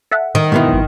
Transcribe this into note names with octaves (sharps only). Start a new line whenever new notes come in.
A4 E5 F#5
D#3
G#2 B2 E3
G#1 F#2